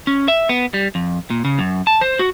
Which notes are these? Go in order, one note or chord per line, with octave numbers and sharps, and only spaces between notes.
C#4
E5
B3
G3
F2
A#2
C#3
F#2
A5
C5
F#4